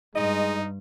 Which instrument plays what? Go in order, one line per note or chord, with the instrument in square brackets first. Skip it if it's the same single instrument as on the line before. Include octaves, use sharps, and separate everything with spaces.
[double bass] G2 [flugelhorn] G#3 [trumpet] D#4 [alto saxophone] D#5